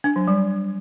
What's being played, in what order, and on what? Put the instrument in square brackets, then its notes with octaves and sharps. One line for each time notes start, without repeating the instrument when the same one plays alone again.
[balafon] D4
F#3
G3